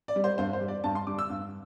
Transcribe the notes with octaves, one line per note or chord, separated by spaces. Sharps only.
D5
G3
C5
G2 C5
C5
G3
D5
G2 A5
C6
D3 G3 D6
E6
G2